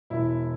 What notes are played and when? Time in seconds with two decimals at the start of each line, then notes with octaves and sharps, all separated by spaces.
0.10 E1 E4